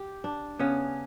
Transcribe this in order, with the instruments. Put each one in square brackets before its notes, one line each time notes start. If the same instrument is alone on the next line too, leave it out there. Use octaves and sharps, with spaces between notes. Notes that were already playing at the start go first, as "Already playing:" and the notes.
Already playing: [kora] G4
D4
[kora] C#3 [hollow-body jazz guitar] B3 C#4